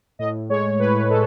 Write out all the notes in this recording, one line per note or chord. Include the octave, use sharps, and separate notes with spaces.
A2 D#5
G#3 C#5
A2 B4
G#3 A4